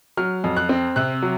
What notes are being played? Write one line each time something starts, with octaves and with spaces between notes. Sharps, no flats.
F#3 F6
F2
F#6
C4
C3 F#6
F#3